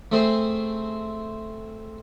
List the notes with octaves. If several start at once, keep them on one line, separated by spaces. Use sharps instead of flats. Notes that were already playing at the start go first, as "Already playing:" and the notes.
A3 C4 G#4 C5